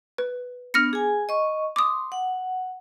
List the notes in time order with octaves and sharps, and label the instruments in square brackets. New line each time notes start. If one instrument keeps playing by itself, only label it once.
[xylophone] B4
[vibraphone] B3 D4 [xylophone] F6 A#6 C#7
[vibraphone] G#4 G#5
D#5 C#6
[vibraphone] C6 [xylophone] D6 D#6
[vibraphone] F#5